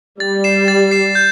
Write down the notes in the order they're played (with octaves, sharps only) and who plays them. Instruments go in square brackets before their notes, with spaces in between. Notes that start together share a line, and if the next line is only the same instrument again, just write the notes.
[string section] G3 [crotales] A6
[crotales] C7 E7
A6
C7 E7
G6